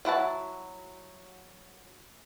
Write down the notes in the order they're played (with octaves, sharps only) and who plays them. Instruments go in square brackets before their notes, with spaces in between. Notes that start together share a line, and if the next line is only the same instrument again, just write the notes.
[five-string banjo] F#3 E4 F#5 A5